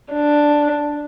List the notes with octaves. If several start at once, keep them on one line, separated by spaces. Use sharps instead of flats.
D4